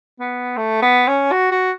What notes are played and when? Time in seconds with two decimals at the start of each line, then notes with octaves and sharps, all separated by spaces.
0.20 B3
0.57 A3
0.82 B3
1.08 C#4
1.32 F#4
1.52 F#4